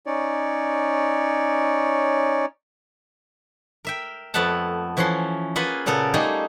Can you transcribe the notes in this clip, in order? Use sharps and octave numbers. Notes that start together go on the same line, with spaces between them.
C#4 D#4 C#5 D5
A#4 E5 G5
F2 A3 B3 E5 F#5 A5
E3 F3 C#4 F#5 C6
A#3 F4 G#4 B4 F#5 G#5
A#2 C#3 B3 A4 A#4
G3 A3 A#3 D#4 G4 G#4